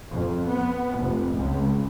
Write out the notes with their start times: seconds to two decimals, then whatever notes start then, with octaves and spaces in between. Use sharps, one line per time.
0.10 F2
0.48 B3
0.96 F1
1.36 C#2